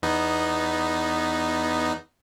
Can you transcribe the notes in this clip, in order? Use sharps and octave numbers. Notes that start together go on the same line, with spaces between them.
E2 B3 D#4